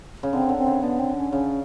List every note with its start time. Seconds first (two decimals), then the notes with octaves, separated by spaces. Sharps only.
0.23 C#3
0.33 D3 C4
0.49 D3
0.58 C4
0.67 C#3
0.82 D3 B3
0.99 C4
1.16 C#4
1.32 C#3 C#4